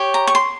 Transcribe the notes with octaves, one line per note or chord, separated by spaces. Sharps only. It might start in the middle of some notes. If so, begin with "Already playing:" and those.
Already playing: G4 C#5
A#5
C#6
C6